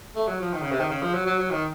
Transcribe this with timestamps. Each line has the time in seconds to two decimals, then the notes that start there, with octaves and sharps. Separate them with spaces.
0.15 A3
0.28 F#3
0.41 F3
0.53 D#3
0.62 C#3
0.71 C3
0.80 D#3
0.90 C#3
1.02 F3
1.14 F#3
1.26 F#3
1.38 F#3
1.51 D#3